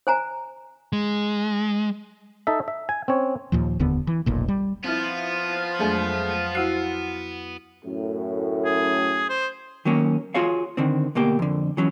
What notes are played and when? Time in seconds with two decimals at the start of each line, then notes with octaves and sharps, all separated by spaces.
0.07 C5 G#5 A#5
0.93 G#3
2.47 D#4 A4 E5
2.68 E5
2.89 G#5
3.08 C4 C#4 C#5
3.52 D#2 A#2 F3
3.79 F1 D#2 D3 B3
4.07 E3
4.26 F1 B1 A#2
4.48 G3
4.84 F3 B3 C4 E4 F4
5.79 F2 F#3 G#3 A3 D4
6.55 E4 F#4 F#5 C7
7.85 F#2 A2
8.65 G#4
9.29 C5
9.85 D#3 F#3 A#3 C#4
10.34 F4 F#4 G#4 C#5 F5
10.77 D3 D#3 C4
11.15 D2 B2 A#3 G4
11.39 F2 D3
11.77 E3 F#3 C#4